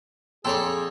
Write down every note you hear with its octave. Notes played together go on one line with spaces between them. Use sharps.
F2 G#4 A4 C#5 D5 G5 C6